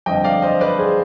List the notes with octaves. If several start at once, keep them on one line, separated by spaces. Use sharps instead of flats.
G1 F2 D3 D#5 G5
D5 F5
C5 D#5
B4 D5
G#4 C5